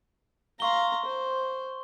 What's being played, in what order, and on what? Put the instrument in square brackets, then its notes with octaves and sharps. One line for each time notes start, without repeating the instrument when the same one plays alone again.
[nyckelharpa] F5 A#5 [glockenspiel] C6 C#6 G7
[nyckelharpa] C5